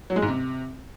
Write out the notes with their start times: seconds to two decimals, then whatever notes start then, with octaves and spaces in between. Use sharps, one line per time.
0.10 F#3
0.16 G#3
0.22 G#2
0.28 C3